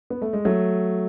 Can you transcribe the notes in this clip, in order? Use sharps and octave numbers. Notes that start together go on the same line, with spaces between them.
B3
A3
G#3
F#3 A3